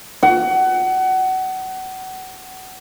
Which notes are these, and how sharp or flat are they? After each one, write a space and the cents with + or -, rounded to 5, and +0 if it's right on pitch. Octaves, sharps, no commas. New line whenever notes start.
F#5 +25